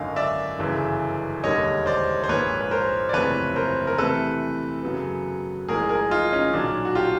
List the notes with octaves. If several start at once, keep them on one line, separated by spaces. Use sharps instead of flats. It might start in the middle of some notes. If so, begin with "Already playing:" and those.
Already playing: G#1 F#2 D3 D#5 F5
D5 E5
G1 F#2 C#3 E3
E1 D#2 D3 G3 A#3 C#5 D#5
C5 D5
C5
A#1 G#2 F3 A#3 B4 C#5
B4
A#4 C5
D5
F#1 E2 C3 F3 A3 B4 C#5
A#4 C5
A#4
E2 C3 E3 A3 A4 B4
F#2 C#3 F#3 B3
A1 G#2 F3 G#4 A#4
G#4 A#4
D#4 F4
C#4 D#4
B1 A#2 F#3 D4
F#4
F4 G4